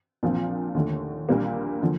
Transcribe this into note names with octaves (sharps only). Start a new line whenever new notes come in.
A#1 A#2 F3 C4 F4
D#2 D3 A3
A#1 A#2 G3 A#3 F4
D3 F3